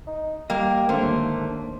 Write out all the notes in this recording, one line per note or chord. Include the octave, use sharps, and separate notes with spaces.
D#4
G3 A#3 G4 D#5
D#2 G#2 D3 A3 A#3 C5